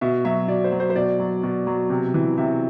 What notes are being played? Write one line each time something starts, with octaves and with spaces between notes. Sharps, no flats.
B2 E5
F#3 E5
B2 D5
C5
F#3
C5
C5
B2 D5
F#3
B2
F#3
C3
E3
C3 E5